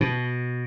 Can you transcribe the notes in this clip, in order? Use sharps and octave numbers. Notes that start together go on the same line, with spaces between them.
B2